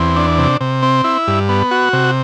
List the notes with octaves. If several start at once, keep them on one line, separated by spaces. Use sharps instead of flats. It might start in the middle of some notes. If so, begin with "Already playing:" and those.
Already playing: E2 C4
D4
C3
C3
C4
E4
G2
B3
F#4
C3